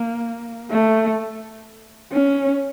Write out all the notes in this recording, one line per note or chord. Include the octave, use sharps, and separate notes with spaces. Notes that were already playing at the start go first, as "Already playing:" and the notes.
Already playing: A#3
A3
C#4